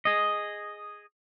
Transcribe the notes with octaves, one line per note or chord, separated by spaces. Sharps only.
G#4 D#5